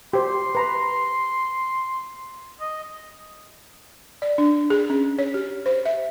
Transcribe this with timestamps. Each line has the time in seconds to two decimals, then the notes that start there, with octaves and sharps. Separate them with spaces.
0.13 G4 C5 C6
0.55 B4 A#5 B5
2.60 D#5
4.22 D5
4.38 D4
4.70 G#4
4.90 C#4
5.18 C#5
5.34 G4
5.66 C5
5.85 E5